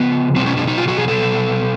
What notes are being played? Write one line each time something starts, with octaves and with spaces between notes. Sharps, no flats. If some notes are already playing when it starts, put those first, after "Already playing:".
Already playing: C#3 F3 B3
B2 F#3 C4
C#4
D4
D#4
F4
F#4
G#4
A4